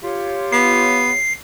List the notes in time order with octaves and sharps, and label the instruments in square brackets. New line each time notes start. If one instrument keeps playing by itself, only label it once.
[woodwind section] F4 G4 C#5
[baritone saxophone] B3 [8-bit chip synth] C7